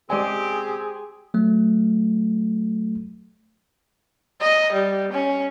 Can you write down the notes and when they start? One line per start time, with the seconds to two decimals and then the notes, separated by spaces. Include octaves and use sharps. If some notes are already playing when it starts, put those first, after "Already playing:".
0.10 G#3 C4 G4 G#4 D5 G#5
1.34 F#3 A3
4.41 D#5
4.73 G3
5.12 C#4